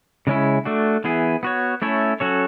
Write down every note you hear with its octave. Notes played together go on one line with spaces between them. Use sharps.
C#3 G#3 C#4 E4
A3 D4 F#4
E3 B3 E4 G#4
B3 F#4 C#5
A3 C#4 E4 A4 C#5
F#3 C#4 F#4 A4 C#5